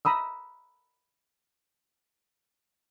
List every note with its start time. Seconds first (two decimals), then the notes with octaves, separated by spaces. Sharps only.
0.05 A#5 B5 D#6 E6